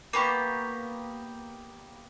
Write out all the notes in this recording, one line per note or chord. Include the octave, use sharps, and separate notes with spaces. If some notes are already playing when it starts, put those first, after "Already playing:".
A#3 B3 G4 C#6